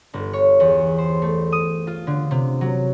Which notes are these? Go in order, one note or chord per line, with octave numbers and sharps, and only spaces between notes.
G1
C#5
E2
C5
A3
D#6
F4
D3
C3
F#3